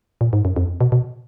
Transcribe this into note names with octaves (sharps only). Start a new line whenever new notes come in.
A#2
G#2
F#2
F2
B2
B2